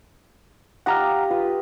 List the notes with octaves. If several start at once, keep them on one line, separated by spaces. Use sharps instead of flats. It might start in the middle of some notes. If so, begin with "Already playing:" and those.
F4 G4 D#5 F#5 A#5 F6
F4 B4